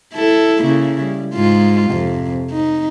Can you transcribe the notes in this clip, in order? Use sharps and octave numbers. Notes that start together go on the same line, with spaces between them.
E4 A4
C#3 A#3 E4
G3
G#2 G#3 F4
F2 C3
D#4